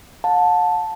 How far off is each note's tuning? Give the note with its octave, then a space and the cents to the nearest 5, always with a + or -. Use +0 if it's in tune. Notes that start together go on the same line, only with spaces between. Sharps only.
F#5 -45 A5 +0